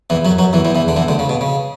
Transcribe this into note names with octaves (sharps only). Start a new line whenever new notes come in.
E2 E3
F#2 F#3
F#2 F#3
E2 E3
E2 E3
E2 E3
D3
E2 E3
D2 D3
C#3
B2
C#3